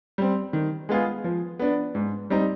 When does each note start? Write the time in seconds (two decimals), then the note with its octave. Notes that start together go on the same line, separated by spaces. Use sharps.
0.18 G3 C4
0.53 D#3
0.89 G#3 B3 F4 G#4
1.24 F3
1.59 B3 D4
1.95 G#2
2.30 G3 C4 D#4